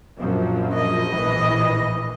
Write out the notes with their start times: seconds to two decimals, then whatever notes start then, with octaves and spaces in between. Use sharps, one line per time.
0.18 A#1 F#2 F3
0.75 D#5
1.08 A#1 A2 E3